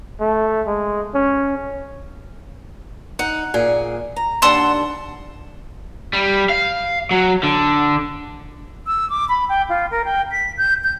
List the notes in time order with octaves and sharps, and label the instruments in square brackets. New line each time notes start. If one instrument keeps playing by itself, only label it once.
[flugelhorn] A3
G#3
C#4
[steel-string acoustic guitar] D#4 [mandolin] F#5
[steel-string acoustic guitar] A#2 G#4
A#5
[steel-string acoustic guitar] D#2 D4 A5 [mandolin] F#5 C6 E6
[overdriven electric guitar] G3
F5
F#3
D3
[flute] E6
D6
B5
G5
F4
A#4
G5
B6
G6
G6